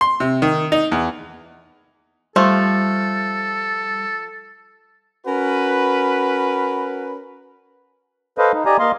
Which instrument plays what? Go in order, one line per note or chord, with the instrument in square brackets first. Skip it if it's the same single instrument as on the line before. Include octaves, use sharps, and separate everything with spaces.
[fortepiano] C6
C3
D#3
D#4
E2
[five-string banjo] F3 A3 [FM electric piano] G3 [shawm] A4
[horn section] C#4 F#4 A#4 B4
[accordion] A4 B4 C5 D#5 F5
D#4
G4 D5 D#5 G#5 A#5
A#3 D#5 F5 C6